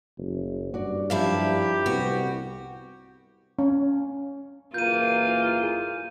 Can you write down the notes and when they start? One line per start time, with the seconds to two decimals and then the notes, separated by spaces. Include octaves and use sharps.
0.18 F#1
0.74 G2 F#4 D5
1.10 F#2 F3 E4 F4 G4 D5 F5
1.86 C2 B3 F#4
3.59 C#4
4.74 F#1 E3 A#3 F4 G6 D#7
5.63 G#4